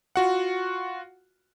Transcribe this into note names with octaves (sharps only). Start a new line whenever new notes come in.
F4 F#4 F#5